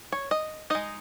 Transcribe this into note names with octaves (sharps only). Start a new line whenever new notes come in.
C#5
D#5
G#3 D#4 D#5